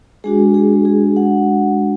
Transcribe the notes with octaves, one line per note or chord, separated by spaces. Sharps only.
G#3 D4 F#4 G#4
G#4
G#4
F#5